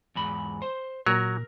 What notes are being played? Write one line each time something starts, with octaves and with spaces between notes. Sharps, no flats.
E2 G#2 B5
C5
A#2 F#3 A#4